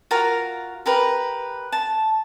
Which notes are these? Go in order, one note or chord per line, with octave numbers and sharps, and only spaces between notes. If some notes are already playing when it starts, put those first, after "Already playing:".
F4 F#4 A#4 F5
G4 A#4 B4
A5